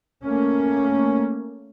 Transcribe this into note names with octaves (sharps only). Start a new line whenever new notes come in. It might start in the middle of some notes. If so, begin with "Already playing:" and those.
A3 A#3 C#4